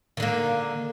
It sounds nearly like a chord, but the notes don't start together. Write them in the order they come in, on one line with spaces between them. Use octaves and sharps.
D#3 D3 A#3